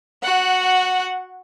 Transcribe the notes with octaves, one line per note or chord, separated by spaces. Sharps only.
F#4 F#5